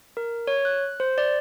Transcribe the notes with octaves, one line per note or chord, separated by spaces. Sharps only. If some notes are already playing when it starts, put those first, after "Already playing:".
A#4
C#5
F#6
C5
D5